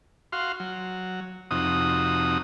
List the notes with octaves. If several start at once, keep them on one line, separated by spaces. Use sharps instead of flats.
F#4 F5 C6
F#3
F2 C3 D#4 F#4 D#6